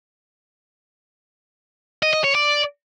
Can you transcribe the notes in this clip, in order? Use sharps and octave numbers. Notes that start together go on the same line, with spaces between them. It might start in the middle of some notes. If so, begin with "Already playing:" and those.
D#5
D#5
C#5
D5